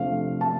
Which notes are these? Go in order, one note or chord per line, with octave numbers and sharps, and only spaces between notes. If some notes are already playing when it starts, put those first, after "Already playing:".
Already playing: C3 F3 A3 D4 F5
A5